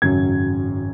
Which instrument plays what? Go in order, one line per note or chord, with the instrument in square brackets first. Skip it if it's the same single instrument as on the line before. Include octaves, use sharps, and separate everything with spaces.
[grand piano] G#1 F#2 C#3 F#3 C#4 G#6